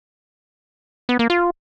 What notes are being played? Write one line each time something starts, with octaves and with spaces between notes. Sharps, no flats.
B3
A#3
F4